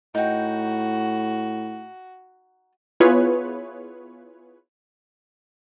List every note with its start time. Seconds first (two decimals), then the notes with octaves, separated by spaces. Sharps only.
0.15 A2 D#4 F#4 G5
3.00 B3 E4 F4 G#4 B4 C#5